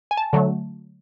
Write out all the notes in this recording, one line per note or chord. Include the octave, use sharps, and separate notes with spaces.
G#5
A5
D3 F#3 A3